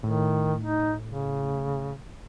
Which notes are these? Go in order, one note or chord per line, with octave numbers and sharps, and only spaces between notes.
A2 D#3
D#4
C#3